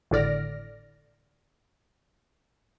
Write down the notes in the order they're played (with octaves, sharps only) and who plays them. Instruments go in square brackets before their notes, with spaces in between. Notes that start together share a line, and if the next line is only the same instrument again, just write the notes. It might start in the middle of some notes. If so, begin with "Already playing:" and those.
[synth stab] G#1 A2 D3 D5 F6 A#6